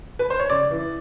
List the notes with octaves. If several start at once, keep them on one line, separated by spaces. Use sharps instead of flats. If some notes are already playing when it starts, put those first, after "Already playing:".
B4
C5
C#5
C#3 D5
E3